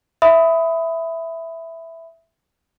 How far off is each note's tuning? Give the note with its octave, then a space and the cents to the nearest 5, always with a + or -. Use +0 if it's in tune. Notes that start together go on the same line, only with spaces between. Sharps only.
E5 +0 B5 +15 D#6 +20